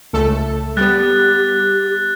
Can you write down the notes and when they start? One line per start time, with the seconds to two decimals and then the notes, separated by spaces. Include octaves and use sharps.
0.13 C#2 A3 A4
0.77 G3 B3 G4 F#6 A6